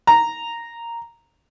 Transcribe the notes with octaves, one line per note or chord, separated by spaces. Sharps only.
A#5